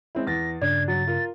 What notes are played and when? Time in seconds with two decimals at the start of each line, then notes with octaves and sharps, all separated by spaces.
0.15 G#3 C4 E4
0.27 E2 A6 A#6
0.62 G2 C#3 D4 G#6
0.88 F#3 A6
1.07 F4 A#4